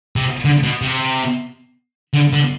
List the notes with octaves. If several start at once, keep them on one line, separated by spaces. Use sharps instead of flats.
C3
D3
B2
C3
D3
D3